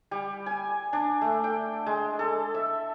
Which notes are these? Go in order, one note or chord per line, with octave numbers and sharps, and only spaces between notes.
G3
G#5
D4
A3
G5
G#3
A4
E5